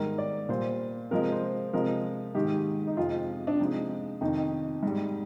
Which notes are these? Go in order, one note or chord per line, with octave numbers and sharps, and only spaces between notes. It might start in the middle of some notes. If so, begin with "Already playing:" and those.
Already playing: G#2 D#3 G3 A#4
D5
A#2 G3 C5
C3 F3 G#3 A#4
C5
C3 F3 G#3 A#4
G#2 D#3 G#3 G4
D#4
F2 C3 F3 G#3 F4
D4
C3 F3 G#3 D#4
F2 C3 D#3 D#4
G#2 G3